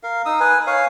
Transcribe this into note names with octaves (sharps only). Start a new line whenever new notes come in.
A#4 F5
D#4 D#6 E6
B4 G#5
C#5 F5 G#5